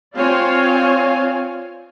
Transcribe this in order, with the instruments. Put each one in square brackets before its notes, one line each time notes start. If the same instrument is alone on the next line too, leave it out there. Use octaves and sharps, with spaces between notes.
[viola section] C4 F4 C#5 D5 F5 G#5